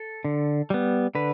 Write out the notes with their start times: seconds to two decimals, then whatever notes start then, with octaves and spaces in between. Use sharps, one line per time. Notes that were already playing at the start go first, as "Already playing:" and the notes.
Already playing: A4
0.25 D3
0.70 G3 B3
1.15 D3 B4